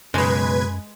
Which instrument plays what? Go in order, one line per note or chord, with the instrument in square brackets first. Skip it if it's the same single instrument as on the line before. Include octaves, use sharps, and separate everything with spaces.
[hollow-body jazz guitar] B1 C#3 [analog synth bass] F#2 [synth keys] G#3 [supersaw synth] B4 G#6